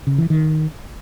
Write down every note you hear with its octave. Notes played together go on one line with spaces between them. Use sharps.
C#3
E3
D#3